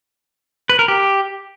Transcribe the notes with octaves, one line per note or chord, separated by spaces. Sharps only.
B4
A#4
G4